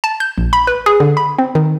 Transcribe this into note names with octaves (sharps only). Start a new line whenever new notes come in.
A5
G6
A#1
B5
B4
G#4
D3
B5
C4
D#3